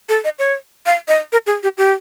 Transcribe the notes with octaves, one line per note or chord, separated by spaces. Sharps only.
A4
D#5
C#5
F5
D#5
A#4
G#4
G4
G4